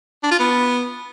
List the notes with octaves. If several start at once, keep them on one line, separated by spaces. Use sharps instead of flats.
D4
F4
B3